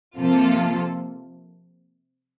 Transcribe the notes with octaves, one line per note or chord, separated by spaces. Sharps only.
C3 F3 A#3 F4 A4